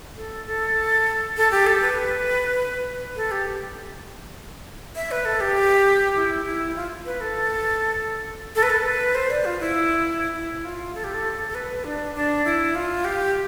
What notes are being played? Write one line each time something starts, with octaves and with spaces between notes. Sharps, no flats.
A4
A4
A4
G4
A4
B4
A4
G4
E5
B4
A4
G4
E4
E4
F4
B4
A4
A4
B4
A4
B4
C5
D5
F4
E4
E4
F4
A4
G4
A4
A4
B4
D4
D4
E4
F4
G4